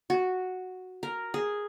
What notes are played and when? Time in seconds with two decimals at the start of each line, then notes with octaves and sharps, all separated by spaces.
0.10 F#4
1.03 A#4
1.34 G#4